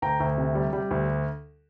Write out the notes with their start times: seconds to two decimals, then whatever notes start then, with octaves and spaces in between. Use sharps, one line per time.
0.02 D2 G5 A#5
0.20 D2
0.38 C3
0.55 G3
0.73 G3
0.91 D2